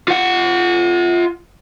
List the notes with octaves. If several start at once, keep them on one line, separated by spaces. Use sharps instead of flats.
F4 F#5